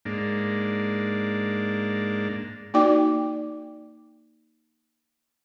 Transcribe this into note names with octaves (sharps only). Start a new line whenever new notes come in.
G#2 A#3 D4
A#3 D#4 F#4 D5 G5 D6